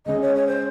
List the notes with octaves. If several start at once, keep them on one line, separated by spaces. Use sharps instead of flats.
C#3 G#3 C#4 D#5
C#5
C#5
C5